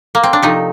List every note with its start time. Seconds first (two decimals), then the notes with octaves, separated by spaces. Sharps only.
0.15 A#3
0.23 C4
0.33 D4
0.42 C3 F3 A3 D#4